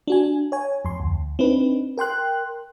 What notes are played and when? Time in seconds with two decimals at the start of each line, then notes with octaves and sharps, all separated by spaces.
0.07 D4 F#4 G#5
0.52 C#5 G#5
0.85 F2 C6
1.00 D2
1.39 C4 D4 D#4 B4
1.98 A#4 G5 C6 F#6